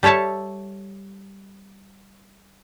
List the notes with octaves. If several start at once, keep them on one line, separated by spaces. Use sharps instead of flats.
G3 A4 C#5 E5 A5